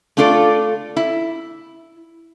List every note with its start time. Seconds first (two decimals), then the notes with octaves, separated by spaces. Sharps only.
0.17 A3 D4 F4 A4 D5
0.96 E4